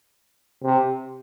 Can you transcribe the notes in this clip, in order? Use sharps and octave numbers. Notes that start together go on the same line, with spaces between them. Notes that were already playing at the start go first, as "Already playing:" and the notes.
C3